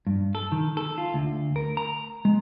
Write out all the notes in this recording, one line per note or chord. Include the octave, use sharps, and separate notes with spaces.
G2
A4
D#3
A4
F4
D2
A#4
A#5
G#3